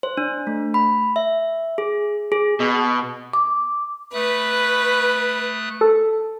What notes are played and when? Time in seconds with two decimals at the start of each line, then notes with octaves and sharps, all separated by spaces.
0.03 C5
0.17 D4
0.47 A3
0.74 B5
1.16 E5
1.78 G#4
2.32 G#4
2.60 B2
3.33 D6
4.14 A3 B4 D#6 F#6
5.81 A4